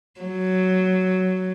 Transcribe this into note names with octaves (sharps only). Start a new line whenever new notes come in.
F#3